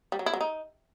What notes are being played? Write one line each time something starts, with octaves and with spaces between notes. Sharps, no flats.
G3
F#3
E4
F#3
D#4